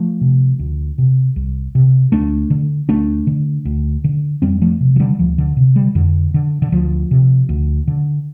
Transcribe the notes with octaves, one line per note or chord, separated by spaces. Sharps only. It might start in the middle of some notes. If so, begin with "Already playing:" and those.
Already playing: F3 A3
C3
D2
C3
C2
C3
D2 A3 D4
D3
D2 A3 D4
D3
D2
D3
F2 G3 C4
F3 A3
C3
F3
D3 G3
D2 F3
D3
C3
D3 G3
F2 D3
D3
D3
D2 F3
C3
D2
D3